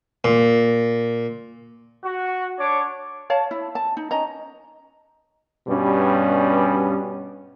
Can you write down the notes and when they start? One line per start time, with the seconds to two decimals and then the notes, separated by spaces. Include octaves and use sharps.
0.24 A#2
2.04 F#4
2.59 D4 C#5 D6
3.30 C#5 F5 A5
3.51 E4
3.75 A5
3.97 D#4
4.11 C#4 D#5 A#5
5.67 G2 B2 G3 C#4